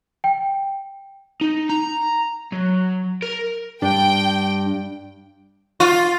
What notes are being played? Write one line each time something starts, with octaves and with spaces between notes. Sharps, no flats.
G5
D#4
A#5
F#3
A#4
G2 D4 G5
F4